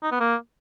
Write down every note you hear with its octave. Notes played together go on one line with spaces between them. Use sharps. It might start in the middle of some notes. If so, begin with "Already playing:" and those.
D#4
B3
A#3